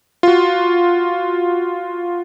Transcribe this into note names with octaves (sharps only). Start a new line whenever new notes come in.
F4 F#4